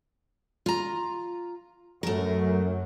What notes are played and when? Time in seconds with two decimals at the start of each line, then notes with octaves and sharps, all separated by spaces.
0.66 F4 A#5
2.03 F#2 F#3 A3 A#4